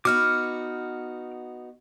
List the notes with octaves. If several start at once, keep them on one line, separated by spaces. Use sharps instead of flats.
B3 D#4 F#4 D6 F6